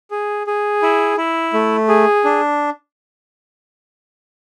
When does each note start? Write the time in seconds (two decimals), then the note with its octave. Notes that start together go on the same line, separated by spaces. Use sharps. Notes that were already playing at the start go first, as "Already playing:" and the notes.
0.11 G#4
0.47 G#4
0.82 E4
1.17 E4
1.53 A3
1.89 G#4
2.24 D4